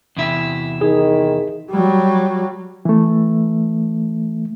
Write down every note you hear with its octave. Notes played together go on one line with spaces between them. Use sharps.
E2 C3 E4
D#3 G#4
F#3 G3
E3 A3